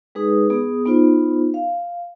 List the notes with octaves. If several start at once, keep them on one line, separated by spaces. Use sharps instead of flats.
G#3 D#4 G#4 B4 D#6
B3 G#4 D#6
B3 D#4 F4 C5
F5